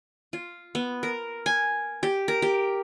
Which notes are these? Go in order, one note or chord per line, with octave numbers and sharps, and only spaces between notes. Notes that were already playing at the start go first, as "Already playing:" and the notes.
F4
B3
A#4
G#5
G4
A#4
G4